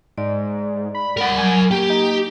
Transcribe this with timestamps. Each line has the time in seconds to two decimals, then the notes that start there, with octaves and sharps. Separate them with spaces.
0.18 G#2 D5
0.95 B5
1.17 A#4 F#5
1.38 F#3 G#5
1.71 A#3 G4 G5
1.90 D#4